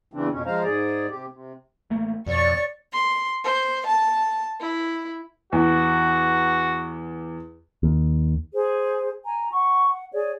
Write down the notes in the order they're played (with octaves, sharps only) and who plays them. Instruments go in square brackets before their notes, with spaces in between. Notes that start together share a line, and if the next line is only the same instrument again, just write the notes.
[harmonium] E2 C#3 E3 C4 D4
F2 B2 C#4
F3 G#3 C5 F5 A#5
G#2 G#4 D5
C3 G4
C3
[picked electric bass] A1 A3 A#3
[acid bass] F2 [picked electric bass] B2 [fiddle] C#5 C#6 [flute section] D5
[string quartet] C6
C5
A5
E4
[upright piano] E2 [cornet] F#4
[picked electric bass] D#2
[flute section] G#4 C5
G#5 A#5
F#5 C#6
F#5
G#4 C#5 D5